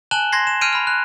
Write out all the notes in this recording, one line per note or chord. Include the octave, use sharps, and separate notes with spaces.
G#5 A5 F#6 E7 F#7 G7
C6 G#6 A#6 C7
E7
F6 G6 C7 D7 D#7 F7
B5 F6
F#6